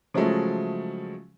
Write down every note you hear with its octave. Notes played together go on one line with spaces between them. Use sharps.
C#3 F3 F#3 G#3 A3